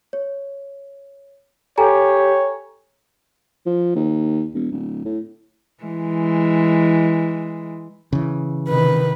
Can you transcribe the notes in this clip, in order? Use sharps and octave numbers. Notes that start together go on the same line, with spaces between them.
C#5
G4 A4 C#5 G#5 A#5
F3
D#2
E1
D1
A2
E3 G#3
C#3 E3
C3 D#3 B4